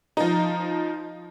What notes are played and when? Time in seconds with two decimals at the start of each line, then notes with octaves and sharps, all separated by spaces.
0.17 F3 D#4